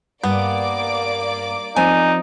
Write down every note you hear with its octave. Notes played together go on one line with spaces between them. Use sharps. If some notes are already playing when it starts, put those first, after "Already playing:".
G2 A#3 B3 D5 D6
F3 C4 D#4 G#5